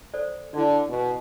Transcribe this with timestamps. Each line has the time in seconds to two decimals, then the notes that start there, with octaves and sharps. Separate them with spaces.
0.14 A4 C5 D5
0.54 D3 E4 D5
0.89 B2